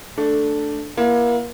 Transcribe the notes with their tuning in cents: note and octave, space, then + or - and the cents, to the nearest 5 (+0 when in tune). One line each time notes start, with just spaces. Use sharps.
A3 +0 D4 +0
A#3 +35 E4 +35